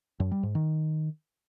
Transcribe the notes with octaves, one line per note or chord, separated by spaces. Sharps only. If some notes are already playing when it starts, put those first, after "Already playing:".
F#2
G3
G#2
D#3